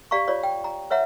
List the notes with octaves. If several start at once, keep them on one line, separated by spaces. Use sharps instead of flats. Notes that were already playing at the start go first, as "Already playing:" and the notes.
G4 D5 F5 A#5 C#6
F4 C#5 D5
G5
A#5
B4 C#5 E5 F#5 A#5